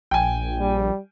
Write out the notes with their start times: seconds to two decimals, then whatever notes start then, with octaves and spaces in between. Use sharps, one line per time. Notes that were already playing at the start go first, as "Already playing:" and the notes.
0.11 A#1 G5 G#5
0.60 G3